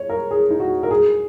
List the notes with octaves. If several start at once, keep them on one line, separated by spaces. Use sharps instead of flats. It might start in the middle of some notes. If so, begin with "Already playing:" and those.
Already playing: C#5
A#4
G#4
D#4
F#4
A#4
G#4